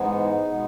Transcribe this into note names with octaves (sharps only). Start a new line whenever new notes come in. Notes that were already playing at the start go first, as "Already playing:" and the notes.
Already playing: G#2 E3 G#3 B3 D#4
B2 G#3 B3